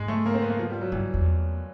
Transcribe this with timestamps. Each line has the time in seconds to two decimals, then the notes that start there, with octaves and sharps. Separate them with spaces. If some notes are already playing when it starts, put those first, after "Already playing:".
Already playing: G#2 G#3
0.08 A3
0.26 A#3
0.34 C4
0.42 B3
0.50 A#3
0.59 F3
0.69 G3
0.81 F#3
0.92 G2 E3
1.14 E2